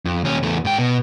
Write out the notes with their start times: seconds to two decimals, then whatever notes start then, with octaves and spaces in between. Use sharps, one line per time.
0.05 F2
0.24 D#2 C#4
0.43 E2 A3
0.65 G#2 G5
0.78 B2